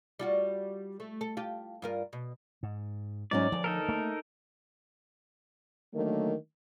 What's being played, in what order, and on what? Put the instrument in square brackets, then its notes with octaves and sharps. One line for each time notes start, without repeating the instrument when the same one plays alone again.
[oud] G3 F4 F#4
A3
A4
F4 G4
G2 F4 A#4
B2
[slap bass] G#2
[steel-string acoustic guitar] G#2 F#3 C#4 [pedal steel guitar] D5
[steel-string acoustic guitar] D2 [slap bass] F3
[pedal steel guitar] D#4 A4 A#4
[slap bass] A3 A#3
[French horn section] D3 D#3 F#3 A3 A#3